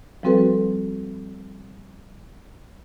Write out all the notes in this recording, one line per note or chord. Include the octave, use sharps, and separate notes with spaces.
F3 G3 C4 F#4 A4 B4